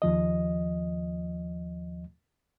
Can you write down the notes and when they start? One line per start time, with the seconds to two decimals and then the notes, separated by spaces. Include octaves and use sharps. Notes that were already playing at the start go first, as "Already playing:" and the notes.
0.02 D#2 F3 D#5